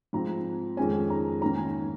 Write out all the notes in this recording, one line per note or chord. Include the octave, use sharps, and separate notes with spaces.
G#2 F3 C4 A#5
F2 D#3 G#3 C#4 G#5
A#5
G#2 D#3 A#3 C#4 A#5
G#5
A#5